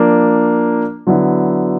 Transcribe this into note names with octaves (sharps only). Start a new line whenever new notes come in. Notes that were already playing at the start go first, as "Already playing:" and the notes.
Already playing: F3 A#3 D4
D3 F#3 B3 E4